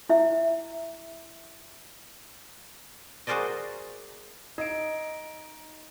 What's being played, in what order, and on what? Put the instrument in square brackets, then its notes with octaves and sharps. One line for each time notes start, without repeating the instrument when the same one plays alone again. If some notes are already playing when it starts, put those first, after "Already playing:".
[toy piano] E4 E5
[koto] F#4 G#4 A#4 C5 D5 D#5
[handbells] D#4 D7 [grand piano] D#5